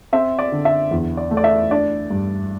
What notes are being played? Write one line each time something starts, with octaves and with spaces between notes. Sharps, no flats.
C4 E5
D5
D3
E5
E2
D5
A3
D5
E5
D4 D5
G2